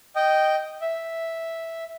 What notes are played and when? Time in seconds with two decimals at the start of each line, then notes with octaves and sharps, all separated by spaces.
0.16 D#5 G5
0.81 E5